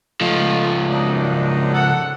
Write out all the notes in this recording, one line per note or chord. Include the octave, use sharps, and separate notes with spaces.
C#2 F3 A3 D#4 F4
F#2 D4 D#4
A4 F#5